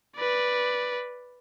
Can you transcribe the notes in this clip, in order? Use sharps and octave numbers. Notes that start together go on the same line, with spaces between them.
B4 D5